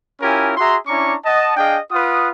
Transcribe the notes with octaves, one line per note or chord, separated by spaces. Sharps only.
C#4 E4 F4 G4 A#4 G#5
F#4 G#4 E5 A#5 C6
C#4 D4 E4 A#5 C#6 D6
D#5 F#5 A5
D4 G#4 D#5 F5 G5
F4 B4 F#5 D#6